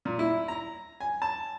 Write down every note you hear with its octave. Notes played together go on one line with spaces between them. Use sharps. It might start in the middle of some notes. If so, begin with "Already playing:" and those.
A#2
E4
A#5
G#5
A5